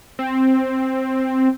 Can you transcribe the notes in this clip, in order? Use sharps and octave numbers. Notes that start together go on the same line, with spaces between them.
C4